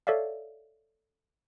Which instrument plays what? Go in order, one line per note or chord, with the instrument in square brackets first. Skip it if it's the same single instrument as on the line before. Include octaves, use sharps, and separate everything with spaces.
[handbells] A4 C#5 D5 E5 F5